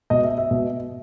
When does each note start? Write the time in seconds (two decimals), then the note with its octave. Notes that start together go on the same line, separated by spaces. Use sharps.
0.10 B2 D#5
0.24 E5
0.38 E5
0.51 B2